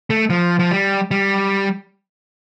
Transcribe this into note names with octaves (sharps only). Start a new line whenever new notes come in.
A3
F3
F3
G3
G3